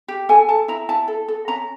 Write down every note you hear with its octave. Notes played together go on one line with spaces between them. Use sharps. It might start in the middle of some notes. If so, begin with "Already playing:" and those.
G4
A4 G#5
A4 A5
E4 A#5
E4 A5
A4
A4
C#4 A#5